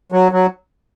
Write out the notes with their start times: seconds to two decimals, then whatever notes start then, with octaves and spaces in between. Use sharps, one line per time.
0.12 F#3
0.32 F#3